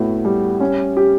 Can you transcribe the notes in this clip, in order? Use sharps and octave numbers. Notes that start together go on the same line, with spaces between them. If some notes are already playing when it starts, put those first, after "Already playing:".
Already playing: A2 B3 F#4
G3
C#4
G4